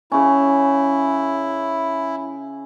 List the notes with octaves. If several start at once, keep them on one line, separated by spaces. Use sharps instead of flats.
C#3 C#4 E4